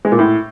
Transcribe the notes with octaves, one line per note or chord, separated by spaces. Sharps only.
G#3
A#2
A2